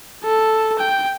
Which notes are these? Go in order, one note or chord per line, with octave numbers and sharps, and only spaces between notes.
A4
G5